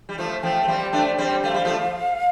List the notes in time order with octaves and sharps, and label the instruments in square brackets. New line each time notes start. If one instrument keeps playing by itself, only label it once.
[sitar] G3
[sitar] F3 A3 [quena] A5
[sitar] F3 A3 [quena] G5
[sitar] A3
G3 C4
A3 D4
G3 C4
[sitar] A3 [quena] F5
[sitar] G3
F3 A3